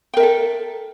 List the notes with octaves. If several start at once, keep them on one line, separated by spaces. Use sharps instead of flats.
A4 A#4 E5 G5